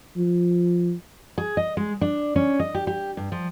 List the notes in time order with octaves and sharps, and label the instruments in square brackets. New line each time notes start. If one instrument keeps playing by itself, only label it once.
[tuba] F3
[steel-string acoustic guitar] G#4
D#5
G#3
D4
C#4
D#5
G4
G4
G2
F3